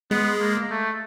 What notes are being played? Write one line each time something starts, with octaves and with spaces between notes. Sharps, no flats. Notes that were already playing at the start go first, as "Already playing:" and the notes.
G#3 B3
A#3
A3